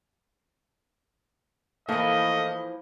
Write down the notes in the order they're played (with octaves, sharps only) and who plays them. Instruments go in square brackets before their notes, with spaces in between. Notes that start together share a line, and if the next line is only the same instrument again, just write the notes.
[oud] E3 F3 [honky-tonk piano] A3 A#3 A4 [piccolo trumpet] D#5